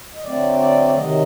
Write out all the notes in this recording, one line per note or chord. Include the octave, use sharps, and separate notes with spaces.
D#5
D3 F#3 A3 C4 D5
D5
D5
C3 D#3 F#3 D#5